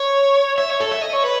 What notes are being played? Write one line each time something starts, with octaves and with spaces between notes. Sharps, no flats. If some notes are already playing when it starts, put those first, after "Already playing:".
Already playing: C#5
E5
C#5
A4
E5
D#5
C#5
B4